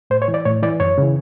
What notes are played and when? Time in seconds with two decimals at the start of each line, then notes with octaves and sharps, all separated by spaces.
0.10 A2 C5
0.22 C#5
0.28 E3
0.34 D5
0.45 A2 C#5
0.63 E3 D5
0.80 F#2 C#5
0.98 C#3 E3